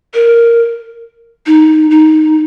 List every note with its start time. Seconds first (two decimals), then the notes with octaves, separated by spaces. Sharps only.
0.14 A#4
1.47 D#4
1.91 D#4